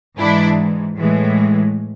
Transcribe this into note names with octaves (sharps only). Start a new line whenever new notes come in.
G#2 E3 G#3 D4 E4
A2 E3 G#3